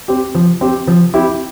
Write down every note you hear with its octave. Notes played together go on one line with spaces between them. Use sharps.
C4 G4
F3
C4 G4
F3
C4 E4 G4